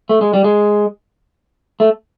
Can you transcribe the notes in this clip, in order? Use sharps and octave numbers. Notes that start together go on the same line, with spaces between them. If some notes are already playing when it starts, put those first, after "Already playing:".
A3
G#3
G3
G#3
A3